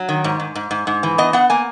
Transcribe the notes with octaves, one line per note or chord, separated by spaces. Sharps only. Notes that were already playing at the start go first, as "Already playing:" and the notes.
Already playing: F#3
D#3
G#2
G#2
G#2
G#2
G#2
E3
B3 D#5
B3 F#5
A#3 G#5